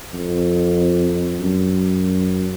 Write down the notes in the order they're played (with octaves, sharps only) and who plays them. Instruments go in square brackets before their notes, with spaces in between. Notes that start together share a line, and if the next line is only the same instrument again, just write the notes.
[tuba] F2
F#2